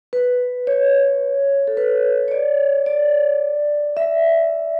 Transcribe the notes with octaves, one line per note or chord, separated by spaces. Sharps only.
B4
C#5
A4
B4
C#5
D5
D5
E5